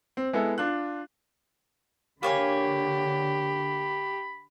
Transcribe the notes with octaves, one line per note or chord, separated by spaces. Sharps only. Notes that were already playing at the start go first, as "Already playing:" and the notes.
C4
G#3 B3 E4 A4
D4 F4 F#6
D3 A#3 G4 C#5 G#5 B5